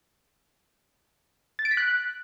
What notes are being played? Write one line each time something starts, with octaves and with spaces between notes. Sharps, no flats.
A6
D7
B6
F#6